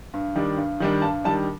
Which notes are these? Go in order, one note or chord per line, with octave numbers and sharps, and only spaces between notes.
G2
D#3 G3 D4
G2
D#3 G3 D4
G2 A5
D#3 G3 D4 A5